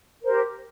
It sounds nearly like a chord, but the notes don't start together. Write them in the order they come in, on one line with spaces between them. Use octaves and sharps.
A#4 C5 G4